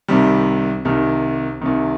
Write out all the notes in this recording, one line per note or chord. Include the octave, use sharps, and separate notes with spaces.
C2 C3 D#3 G3
C2 C3 D#3
C2 C3 D#3